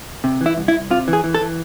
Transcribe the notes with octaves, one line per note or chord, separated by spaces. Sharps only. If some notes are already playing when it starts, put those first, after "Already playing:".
C3
E3
E4
C2
E4
C2
C3 F4
E3
G#4
E3
A4
E3